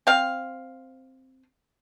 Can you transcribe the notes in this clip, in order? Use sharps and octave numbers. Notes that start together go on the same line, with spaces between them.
C4 F5